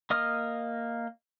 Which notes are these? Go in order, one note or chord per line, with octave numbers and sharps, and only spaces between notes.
A#3 D#5 D#6 F6